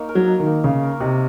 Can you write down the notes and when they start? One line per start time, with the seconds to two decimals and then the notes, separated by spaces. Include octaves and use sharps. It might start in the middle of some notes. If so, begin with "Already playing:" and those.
Already playing: A#3 D#4 C#5
0.09 A#4
0.15 F#3
0.28 D#4
0.40 D#3
0.46 A#3
0.64 C#3 C#5
0.83 A#4
1.00 C3 D#4